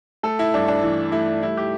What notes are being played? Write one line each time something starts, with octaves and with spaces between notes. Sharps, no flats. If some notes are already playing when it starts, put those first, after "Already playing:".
A3 A4
E4
G2 D4
D4
E3
A3 E4
G3 E4
G4